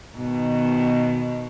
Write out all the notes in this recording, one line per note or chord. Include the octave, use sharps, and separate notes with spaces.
B2 D#3